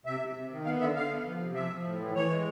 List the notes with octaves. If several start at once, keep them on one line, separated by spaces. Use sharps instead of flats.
C3 E5
C3
C3
D#3
B3 F5
D3 E5
D3 F5
B3
F3
C3
F3 E5
F3
A2
E3
E3 C#5
G#3